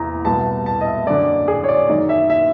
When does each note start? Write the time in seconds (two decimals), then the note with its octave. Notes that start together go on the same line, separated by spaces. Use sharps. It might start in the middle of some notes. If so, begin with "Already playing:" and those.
Already playing: E2 C3 E3 A#5
0.25 C2 B2 A5
0.66 A5
0.81 D#5
0.87 E5
1.06 F#2 D3 D5
1.48 G#4
1.64 C#5
1.68 D5
1.89 F#2 D#3 D#5
2.09 E5
2.30 E5